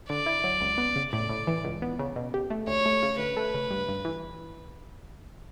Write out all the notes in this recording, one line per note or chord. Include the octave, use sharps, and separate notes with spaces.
D3 D5
E4
F#3
C#2
B3
C#3
A2 D5
A2
E3
C#2
B3
C#3
B2
G4
A3
D2 C#5
A3
C#3
D2 B4
A3
C#3
G2
G2
E3